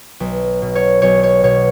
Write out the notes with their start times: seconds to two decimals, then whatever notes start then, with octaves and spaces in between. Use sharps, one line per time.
0.20 B1
0.62 B2
0.75 C#5
1.02 B1 C#5
1.23 C#5
1.43 B2 C#5